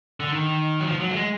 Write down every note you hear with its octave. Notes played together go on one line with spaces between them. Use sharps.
D3
D#3
F#3
F3
F#3
A3
G#3